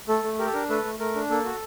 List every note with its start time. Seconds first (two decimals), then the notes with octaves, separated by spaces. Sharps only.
0.08 A3 A4
0.24 A3
0.38 G4 A#4
0.46 A4
0.53 D4 A#4
0.69 A3 A4 B4
0.85 A3
0.99 A3 A#4
1.15 D4
1.30 A#3 A4
1.45 F#4